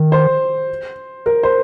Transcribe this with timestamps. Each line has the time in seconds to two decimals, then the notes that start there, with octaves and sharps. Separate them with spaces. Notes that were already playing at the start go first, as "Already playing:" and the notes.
Already playing: D#3
0.12 C5
1.26 A#4
1.43 C5